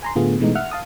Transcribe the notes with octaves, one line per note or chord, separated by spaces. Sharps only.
G#5 A#5 C6
A2 D3 A3 B3 F4 G#4
B2 E3 G#3 A3 D#4
E5 F#5 F6
F5 A5 D#6